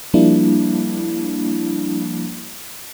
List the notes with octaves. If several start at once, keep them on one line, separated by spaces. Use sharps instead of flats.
F3 G3 A#3 D4 E4